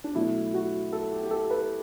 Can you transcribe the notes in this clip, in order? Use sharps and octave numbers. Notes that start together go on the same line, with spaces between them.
D4
B2 F#3 A3 E4
F#4
A4
G4
G4
A4
B4